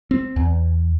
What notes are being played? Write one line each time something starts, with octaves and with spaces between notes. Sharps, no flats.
C4
E2